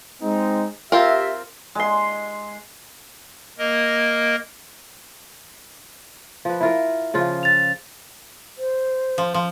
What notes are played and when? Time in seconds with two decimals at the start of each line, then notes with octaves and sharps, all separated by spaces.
0.22 G#3 C4 D#4
0.92 C4 F4 G4 A#4 E5
1.75 G#3 C6
3.58 A#3 A#4 D#5
6.45 F3 B4
6.61 E4 F4 A#4
7.14 C#3 F3 F4
7.43 A6 F7
8.58 C5
9.18 F3
9.34 F3